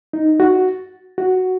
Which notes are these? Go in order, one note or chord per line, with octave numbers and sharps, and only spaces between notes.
D#4
F#4
F#4